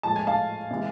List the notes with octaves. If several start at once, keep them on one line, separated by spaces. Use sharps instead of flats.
A2 F3 G#3 A5
G#5
F5 A5
C3 E3 G#3